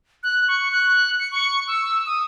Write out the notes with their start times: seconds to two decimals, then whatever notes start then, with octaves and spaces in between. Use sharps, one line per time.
0.23 F#6
0.48 C#6
0.72 F#6
1.20 C#7
1.31 C#6
1.68 E6
2.06 D#6